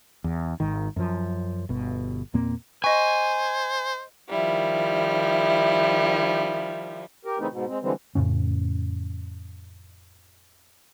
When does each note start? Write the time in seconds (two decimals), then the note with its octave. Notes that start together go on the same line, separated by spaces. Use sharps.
0.24 E2
0.60 G#1 G#2 D#3
0.96 F#2 F3
1.69 G1 B2
2.34 E2 A#2 A#3 C4
2.84 C5 D#5 G#5 C#6
4.28 D#3 F3 G3 E4
7.25 G4 A#4
7.39 C#3 E3 A3 B3 C4 D#4
7.51 G#2 B2
7.68 G#3 C4
7.82 D3 E3 G3 G#3 C4
8.15 F2 A2 C#3 C#4